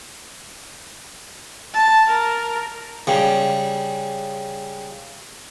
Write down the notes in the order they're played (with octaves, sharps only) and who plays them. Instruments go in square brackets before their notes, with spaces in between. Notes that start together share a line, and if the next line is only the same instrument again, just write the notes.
[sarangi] A5
A#4
[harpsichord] C#3 G3